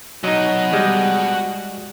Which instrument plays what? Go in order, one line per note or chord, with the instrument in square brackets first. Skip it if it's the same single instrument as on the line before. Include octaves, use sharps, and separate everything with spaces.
[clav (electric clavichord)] F#3 D#4 [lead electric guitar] F#4 D#5
[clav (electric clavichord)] G3 G#3